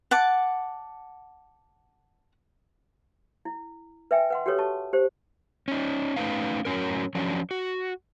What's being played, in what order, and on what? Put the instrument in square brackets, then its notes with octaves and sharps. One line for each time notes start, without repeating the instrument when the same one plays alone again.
[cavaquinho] F#5 A5 D6
[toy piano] E4
B4 E5 G5 G#5
B4 F#5 C6
F#4 G4 A4 B4 C#5
A5 C#6
G4 C5
[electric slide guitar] C#4 D#4
A3 C#4 D#4 B4 F5
A2 F#3 C#4 A#4
F3 F#3 C#4 D4
F#4